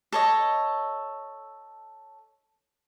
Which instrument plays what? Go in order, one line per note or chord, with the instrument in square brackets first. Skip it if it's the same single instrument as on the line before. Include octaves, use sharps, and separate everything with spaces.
[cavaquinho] A4 C#5 D#5